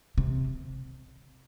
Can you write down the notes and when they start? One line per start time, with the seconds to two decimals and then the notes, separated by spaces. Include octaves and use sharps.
0.18 C3